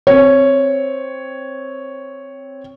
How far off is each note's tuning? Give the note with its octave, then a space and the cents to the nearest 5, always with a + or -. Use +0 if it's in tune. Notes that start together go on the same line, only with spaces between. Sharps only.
C4 +5 C#5 +0